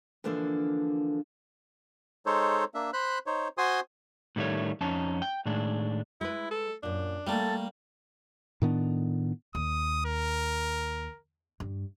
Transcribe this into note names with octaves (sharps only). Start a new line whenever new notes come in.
D3 E3 F3 A#3 D4 A4
G#3 D#4 A4 C5 C#5
A#3 D4 E5
C5 B5 F#6
D#4 C5 C#5
F#4 C5 G#5 C6 D#6
A2 D#3 G3 A3 C#5
F2 C#4 D#4 A5
G5
A2 D#3 G#3 D4
G#3 E4 B4
A4
F#2 A#2 D4
G3 A3 A#3 A4
A2 D#3 B3 D4
D#2 D#6
A#4
G2